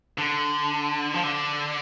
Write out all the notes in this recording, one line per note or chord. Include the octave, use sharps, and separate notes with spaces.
D3
F3
D3